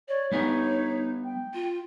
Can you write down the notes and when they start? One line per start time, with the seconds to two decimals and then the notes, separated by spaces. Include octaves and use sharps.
0.09 C#5 D5
0.32 G3 B3 D#4 C#5 G#5
1.25 G5
1.54 F4